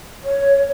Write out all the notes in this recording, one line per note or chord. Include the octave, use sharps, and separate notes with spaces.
C#5